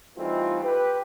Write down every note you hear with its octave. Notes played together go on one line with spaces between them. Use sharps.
E3 G3 A3 C4 D#4 F4
G4 B4